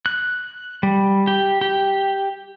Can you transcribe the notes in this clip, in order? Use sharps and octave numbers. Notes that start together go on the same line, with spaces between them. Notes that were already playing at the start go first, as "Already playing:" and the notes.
F#6
G3
G4
G4